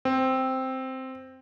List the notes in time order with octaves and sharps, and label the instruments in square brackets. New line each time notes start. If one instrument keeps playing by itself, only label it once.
[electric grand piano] C4